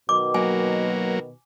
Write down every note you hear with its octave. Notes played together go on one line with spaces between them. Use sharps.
B2 D#3 D6
F#3 A#3 G#5